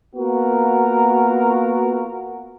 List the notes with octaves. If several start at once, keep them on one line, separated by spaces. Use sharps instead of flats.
A#3 B3 F4 F#4 A#4